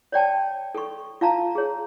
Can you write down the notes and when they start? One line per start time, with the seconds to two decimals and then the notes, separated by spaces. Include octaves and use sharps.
0.12 C#5 D5 G5 A5
0.75 A4 C#6
1.21 F4 F5 A5 A#5
1.55 G#4 C#5